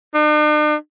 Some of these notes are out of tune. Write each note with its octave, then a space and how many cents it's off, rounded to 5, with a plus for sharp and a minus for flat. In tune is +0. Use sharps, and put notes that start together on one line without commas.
D4 +45